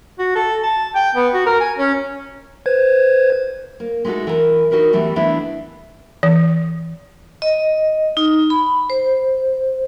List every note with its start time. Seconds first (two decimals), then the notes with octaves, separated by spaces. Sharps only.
0.19 F#4
0.36 A4
0.63 A5
0.95 G5
1.15 B3
1.34 F#4
1.46 A#4
1.60 G#5
1.78 C#4
2.66 B4 C5 G#6
3.80 A#3
4.05 G#3 A3 D#4 F4 F#4 A4
4.27 E3 A#4
4.71 D#4 F#4 A#4 B4
4.93 E3 G3 A3 B3
5.16 E3 A3 B3 D4 E4
6.23 E3
7.42 D#5
8.17 D#4
8.50 B5
8.90 C5